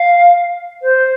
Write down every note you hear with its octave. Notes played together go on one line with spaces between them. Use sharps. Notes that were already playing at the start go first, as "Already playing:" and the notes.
Already playing: F5
C5